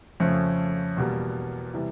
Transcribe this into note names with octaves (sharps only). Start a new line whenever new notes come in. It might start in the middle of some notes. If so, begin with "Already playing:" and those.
F2 C#3 F3 A3 C#4
E2 B2 G3 A#3
C3 E3 G3